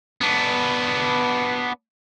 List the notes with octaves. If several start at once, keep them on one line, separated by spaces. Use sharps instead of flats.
B3 D4